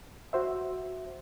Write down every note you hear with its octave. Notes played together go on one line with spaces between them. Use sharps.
F#4 C5 E5